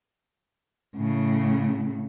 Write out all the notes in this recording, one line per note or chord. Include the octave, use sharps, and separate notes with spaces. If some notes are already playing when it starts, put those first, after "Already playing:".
A2 C#3